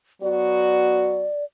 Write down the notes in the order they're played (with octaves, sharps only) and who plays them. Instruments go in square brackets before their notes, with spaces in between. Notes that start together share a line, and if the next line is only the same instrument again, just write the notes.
[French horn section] F#3 B3 F#4 [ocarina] D5